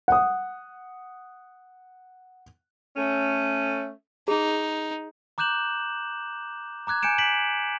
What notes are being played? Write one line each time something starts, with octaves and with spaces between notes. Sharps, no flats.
F#5 D#6
A3 C#4
D#4 G#4
A#5 D6 F#6 G6 E7 F#7
A#5 D6 F#6 G#6
G#5 G6 C#7 D7 E7
B6 D7 F#7